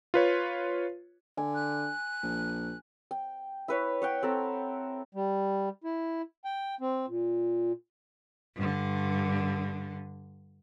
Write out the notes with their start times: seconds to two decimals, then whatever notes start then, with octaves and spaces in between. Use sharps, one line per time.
0.14 F4 B4 C#5
1.37 D3 G#5
1.54 F#6
2.23 A#1
3.11 G5
3.68 E4 B4 C#5
4.02 C#5 F#5 G5
4.23 C4 A4 A#5
5.15 G3
5.84 E4
6.45 G5
6.81 C4
7.08 A#2
8.55 G2 D3